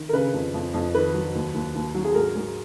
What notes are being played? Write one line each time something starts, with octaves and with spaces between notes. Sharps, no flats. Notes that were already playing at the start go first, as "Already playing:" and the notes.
Already playing: D#3
A#4
C#3 B4
F2
F2
F2
D#3 B4
F#3
D#2
D#2
D#2
F#3
G#4
G#2 A#4
G#2